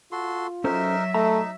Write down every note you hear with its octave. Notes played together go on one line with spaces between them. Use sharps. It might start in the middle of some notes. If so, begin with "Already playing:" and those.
F4 F#4 A4 C6
F#3 C#4 D#4 A4 A#4 C5 E5
A3 D#4 A#5